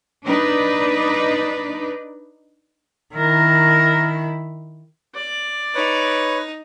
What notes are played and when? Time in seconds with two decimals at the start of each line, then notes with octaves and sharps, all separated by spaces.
0.25 D4 D#4 B4 D5
3.13 D#3 E4 A#4
5.15 D5
5.75 D#4 B4 C#5